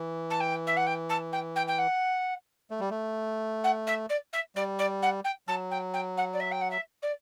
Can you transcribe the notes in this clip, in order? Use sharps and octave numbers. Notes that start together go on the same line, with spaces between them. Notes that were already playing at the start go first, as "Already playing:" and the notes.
Already playing: E3
A5
G5
E5
F#5
G5
A5
G5
G5
G5
F#5
A3
G3
A3
F#5
E5
D5
E5
G3 D5
D5
F#5
G5
F#3 A5
G5
G5
F#5
D5
E5
G5
F#5
E5
D5